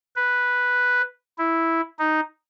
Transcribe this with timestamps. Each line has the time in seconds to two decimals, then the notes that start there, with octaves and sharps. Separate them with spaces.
0.16 B4
1.38 E4
1.99 D#4